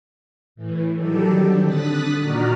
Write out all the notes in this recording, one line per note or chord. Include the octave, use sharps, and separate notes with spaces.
A2 E3
D#3 F#3 G3 G4 A4
C4 D4
D3 D#6 F#6 A6 B6
A#2 D#3 F#4 D5 A#5 F6